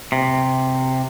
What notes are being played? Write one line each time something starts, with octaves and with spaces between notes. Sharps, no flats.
C3